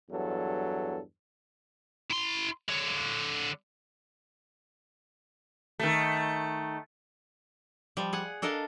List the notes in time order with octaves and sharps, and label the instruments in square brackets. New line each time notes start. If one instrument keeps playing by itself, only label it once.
[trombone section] E2 G2 F#3 A4
[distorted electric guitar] E4 C6
D3 C#5
[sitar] D#3 A3
[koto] F3 G3
G#4 F#5 G#5
D4 A4 A#4 D#5 F5